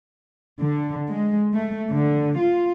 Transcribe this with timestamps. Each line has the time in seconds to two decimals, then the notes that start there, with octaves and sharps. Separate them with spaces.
0.61 D3
1.10 G#3
1.54 A3
1.91 D3
2.39 F4